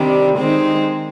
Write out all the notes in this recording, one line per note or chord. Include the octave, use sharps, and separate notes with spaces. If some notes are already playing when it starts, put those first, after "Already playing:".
Already playing: C3 D#3 G3 D4
D#3 G#3 C4 D#4